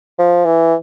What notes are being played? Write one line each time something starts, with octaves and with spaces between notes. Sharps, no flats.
F3
E3